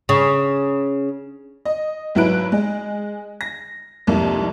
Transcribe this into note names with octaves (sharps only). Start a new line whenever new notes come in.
C#3
D#5
G#1 F#3 E4 B4 F#6 D7
G#3
A#6
C2 F2 G#2 C3 A#3